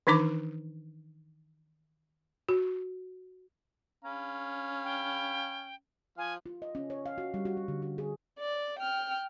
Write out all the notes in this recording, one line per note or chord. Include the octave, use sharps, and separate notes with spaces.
D#3 E3 D4 D#4 A#5 D6
F#4
C#4 F5 B5
G5
F3 F5 G#5
F4
D#5
C#4
C#5
F5
F#4
G3
F#4
G3
D3
F#4
G#4
D5
G5 F6